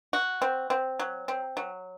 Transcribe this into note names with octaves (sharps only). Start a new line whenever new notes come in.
F#4
C4
C4
F#3
C4
F#3